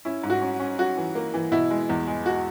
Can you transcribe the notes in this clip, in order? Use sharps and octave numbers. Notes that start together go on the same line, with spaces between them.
C#4 E4
G#2
F#4
C#4
C#4
C#4 F#4
E3
A#3
E3
B2 E4
G#3
E2
G#3
F#4